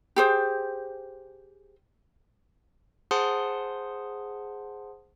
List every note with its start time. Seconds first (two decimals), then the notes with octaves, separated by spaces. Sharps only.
0.16 G4 G#4 C5
3.11 G#4 C5 F#5 A5 C6 D#6